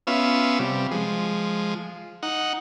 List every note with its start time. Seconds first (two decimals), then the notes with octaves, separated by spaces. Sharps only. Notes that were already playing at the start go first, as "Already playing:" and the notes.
0.07 B3 C#4 F4 E5
0.59 C3 G3
0.91 F3 G#3
2.23 D#4 F#5